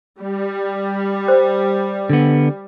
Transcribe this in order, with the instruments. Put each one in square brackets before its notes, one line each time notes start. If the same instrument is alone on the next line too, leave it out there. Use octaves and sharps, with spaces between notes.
[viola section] G3
[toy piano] C5
[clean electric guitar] D3 B3